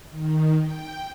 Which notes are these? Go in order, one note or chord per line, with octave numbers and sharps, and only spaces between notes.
D#3
G5